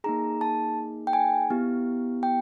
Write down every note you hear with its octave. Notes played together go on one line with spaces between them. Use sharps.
A#3 D#4 G#4 A#5
A5
G5
G#5
B3 E4 G4
G5